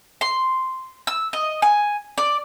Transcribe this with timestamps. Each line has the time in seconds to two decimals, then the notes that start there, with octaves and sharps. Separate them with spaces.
0.21 C6
1.07 E6
1.33 D#5
1.62 G#5
2.18 D5